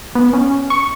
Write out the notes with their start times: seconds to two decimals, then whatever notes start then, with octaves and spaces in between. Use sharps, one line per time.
0.15 B3
0.33 C#4
0.70 C#6